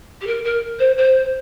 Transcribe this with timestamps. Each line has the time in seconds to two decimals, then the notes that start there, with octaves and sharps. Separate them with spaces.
0.21 G4
0.26 A#4
0.44 A#4
0.79 C5
0.97 C5